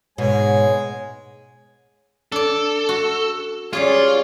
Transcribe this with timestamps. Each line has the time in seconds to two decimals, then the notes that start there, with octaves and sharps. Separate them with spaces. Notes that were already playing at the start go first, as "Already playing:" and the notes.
0.18 G#2 B2 G#3 C#5 G#5
2.32 D4 A4 D5
2.89 F#4
3.73 G3 C#4 F4 G#4 C#5 D5